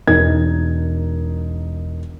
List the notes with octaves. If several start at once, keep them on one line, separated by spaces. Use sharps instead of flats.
E1 D#4 A#4 G#6